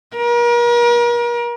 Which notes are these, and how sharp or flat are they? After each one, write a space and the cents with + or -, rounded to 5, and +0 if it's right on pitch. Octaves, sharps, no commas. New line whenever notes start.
A#4 +40